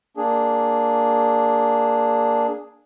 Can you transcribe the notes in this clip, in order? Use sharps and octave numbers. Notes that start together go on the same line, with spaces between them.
A#3 D4 G#4